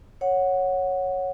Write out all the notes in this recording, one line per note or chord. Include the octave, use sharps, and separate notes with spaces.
C#5 F#5